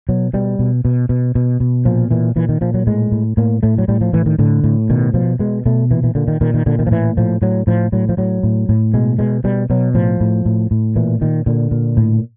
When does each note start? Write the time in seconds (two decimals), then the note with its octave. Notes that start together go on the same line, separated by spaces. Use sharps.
0.09 B2 F#3
0.34 B2 G3
0.59 B2
0.85 B2
1.09 B2
1.35 B2
1.60 B2
1.85 A#2 F3
2.11 A#2 E3
2.36 A#2 E3
2.49 D#3
2.61 A#2 F3
2.74 F#3
2.87 A2 G#3
3.12 A2
3.37 A2 A#3
3.63 A2 A3
3.78 F#3
3.88 A2 G3
4.01 F3
4.13 A2 E3
4.26 D#3
4.39 A2 D3
4.64 A2
4.90 B2 D#3
5.14 B2 F3
5.39 B2 G#3
5.66 B2 A3
5.91 A#2 E3
6.03 E3
6.15 A#2 D3
6.28 D#3
6.41 A#2 D#3
6.54 D#3
6.66 A#2 D3
6.79 D#3
6.87 F3
6.91 A2 E3
7.17 A2 F3
7.42 A2 F#3
7.67 A2 F3
7.92 A2 F#3
8.09 F3
8.17 A2 F#3
8.43 A2
8.69 A2
8.94 B2 G#3
9.19 B2 G#3
9.44 B2 G3
9.70 B2 F#3
9.94 A2 F3
10.20 A2
10.45 A2
10.71 A2
10.96 A#2 E3
11.21 A#2 D#3
11.46 A#2 D3
11.71 A#2
11.97 A2